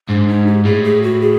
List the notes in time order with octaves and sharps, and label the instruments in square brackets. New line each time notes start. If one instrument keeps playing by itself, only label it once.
[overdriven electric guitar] G#2 [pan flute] D4
[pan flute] D#4
G4
[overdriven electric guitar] A2 [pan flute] G#4
[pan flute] G#4
F#4
G#4